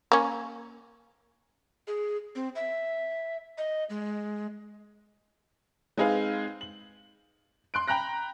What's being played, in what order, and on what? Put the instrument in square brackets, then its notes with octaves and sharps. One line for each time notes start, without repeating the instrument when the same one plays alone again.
[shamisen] A#3 C#4
[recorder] G#4
C4
E5
D#5
G#3
[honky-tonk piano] G#3 C4 D#4 G#4 B4 F5
F#7
C6 F#6 D7
G5 A#5 B5 F#6 A#6